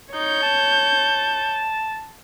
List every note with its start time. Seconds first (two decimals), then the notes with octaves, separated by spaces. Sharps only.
0.14 D#4 C#5 G6
0.43 A5